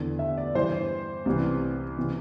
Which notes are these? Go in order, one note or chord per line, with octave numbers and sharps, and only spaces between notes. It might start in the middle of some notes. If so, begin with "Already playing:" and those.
Already playing: E2 D3
E5
D5
G2 E3 C5
C2 C3 E3
C3 E3